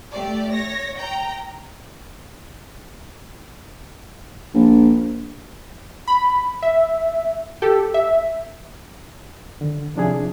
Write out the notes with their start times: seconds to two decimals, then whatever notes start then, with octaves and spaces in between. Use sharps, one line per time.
0.12 A3 G4 D5
0.52 C#5 A#6
0.98 G5 A#5
4.54 A#1
6.08 B5
6.62 E5
7.62 G4 A4
7.94 E5
9.61 D3
9.96 C3 F3 C#4 D4 E4 G#4